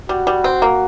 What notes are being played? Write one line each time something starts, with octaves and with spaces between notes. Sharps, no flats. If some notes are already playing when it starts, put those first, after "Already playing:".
G3 F#4
G3
C4
A#3